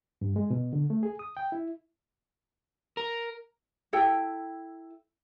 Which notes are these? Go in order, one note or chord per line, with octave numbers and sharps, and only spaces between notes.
G2
G#3
B2
D3
A3
G#4
D#6
G5
E4
A#4
E4 A4 G5